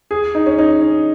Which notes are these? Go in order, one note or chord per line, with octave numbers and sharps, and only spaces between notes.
G#4
D#4
C#4
D#4
C#4